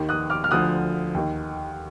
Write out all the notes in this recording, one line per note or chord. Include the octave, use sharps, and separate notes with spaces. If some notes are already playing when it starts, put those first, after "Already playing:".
Already playing: D#2 D#3
D#6 F#6
D6 F6
F6
D2 D3 F3 D#6 F#6
D#2 D#3